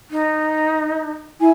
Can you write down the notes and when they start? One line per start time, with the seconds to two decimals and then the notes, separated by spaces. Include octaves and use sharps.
0.10 D#4
1.40 E4 G#5